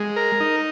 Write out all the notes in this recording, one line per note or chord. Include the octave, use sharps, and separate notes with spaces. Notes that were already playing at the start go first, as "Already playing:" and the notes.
Already playing: G#3
A#4
D#4